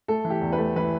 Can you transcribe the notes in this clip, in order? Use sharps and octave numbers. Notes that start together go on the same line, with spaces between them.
A3 A4
E3
G4
E2
B4
A3
E3 B4